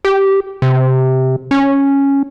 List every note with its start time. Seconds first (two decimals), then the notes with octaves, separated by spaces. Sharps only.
0.05 G4
0.62 C3
1.51 C#4